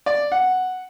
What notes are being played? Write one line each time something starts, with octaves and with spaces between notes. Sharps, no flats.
D5
F#5